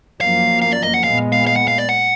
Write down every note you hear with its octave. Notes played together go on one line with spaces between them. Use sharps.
F#2 F3 A#3 F5
F5
D5
D#5
F#5
A#2 G#3 B3 F5
F5
F5
F#5
F5
D5
F#5